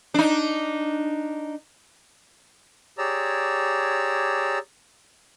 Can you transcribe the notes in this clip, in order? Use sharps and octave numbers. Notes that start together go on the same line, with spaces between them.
D4 D#4
G4 G#4 C#5 D5 A#5 E6